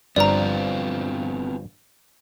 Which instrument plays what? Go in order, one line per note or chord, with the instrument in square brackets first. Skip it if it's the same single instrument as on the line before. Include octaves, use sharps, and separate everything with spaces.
[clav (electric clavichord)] G1 G2 F3 [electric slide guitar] B3 C4 F4 [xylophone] D5 A#5